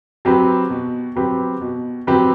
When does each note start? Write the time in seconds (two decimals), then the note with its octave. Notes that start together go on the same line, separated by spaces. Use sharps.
0.25 F#3 C4 G4 B4
0.70 B2
1.15 F#3 C4 G4 B4
1.61 B2
2.07 F#3 C4 G4 B4